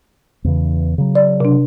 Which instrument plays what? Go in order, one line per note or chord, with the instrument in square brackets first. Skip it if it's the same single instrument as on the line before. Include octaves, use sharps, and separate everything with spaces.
[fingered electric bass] E2 C#3 E3
C#3 F#3
[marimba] D5
C3 D4